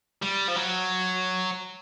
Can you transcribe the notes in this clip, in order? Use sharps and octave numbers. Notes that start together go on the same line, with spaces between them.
G3
F3
F#3